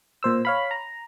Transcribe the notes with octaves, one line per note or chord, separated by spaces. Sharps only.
A#2 C5 E6
C#5 F5 B5
A#5